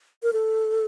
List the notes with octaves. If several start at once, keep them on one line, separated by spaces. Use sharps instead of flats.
A#4
A4